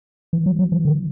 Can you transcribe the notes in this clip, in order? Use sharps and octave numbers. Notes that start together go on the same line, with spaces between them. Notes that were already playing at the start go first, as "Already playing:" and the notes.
E3
F#3
F#3
E3
D3